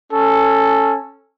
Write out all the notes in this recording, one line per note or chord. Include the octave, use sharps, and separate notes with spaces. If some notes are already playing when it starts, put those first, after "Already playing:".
C#4 A4